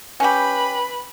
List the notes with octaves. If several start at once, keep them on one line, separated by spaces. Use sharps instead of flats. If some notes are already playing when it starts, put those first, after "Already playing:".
C#4 G4 B4 B5